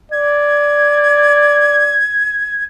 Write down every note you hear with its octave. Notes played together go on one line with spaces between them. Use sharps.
D5 G#6